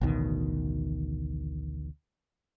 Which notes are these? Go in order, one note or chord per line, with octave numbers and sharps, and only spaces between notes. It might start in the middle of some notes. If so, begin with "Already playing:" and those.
A1 D2 B2 D#3